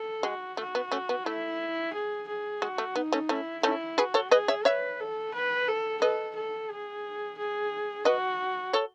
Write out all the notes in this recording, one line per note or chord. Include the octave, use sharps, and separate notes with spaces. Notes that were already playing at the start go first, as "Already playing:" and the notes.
Already playing: A4
G#3 F#4
A3 F#4
B3
A3 C#4
B3
A3 E4
G#4
G#4
G#3 F#4
A3
B3 D#4
A3 C#4
A3 C#4 E4
A3 C#4 E4
F#4 G#4 B4
A4 C#5
G#4 B4 D#5
C#5 E5
B4 C#5 E5
A4
B4
A4
A4 B4 D#5
A4
G#4
G#4
F#4 B4 D#5
A4 C#5